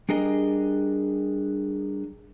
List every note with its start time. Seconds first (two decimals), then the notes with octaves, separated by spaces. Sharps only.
0.09 G3 D4 G#4 A#4 D#5